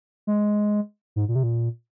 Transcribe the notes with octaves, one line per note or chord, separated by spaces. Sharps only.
G#3
G#2
A#2
C3
A#2